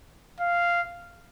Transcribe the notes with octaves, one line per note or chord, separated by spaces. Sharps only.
F5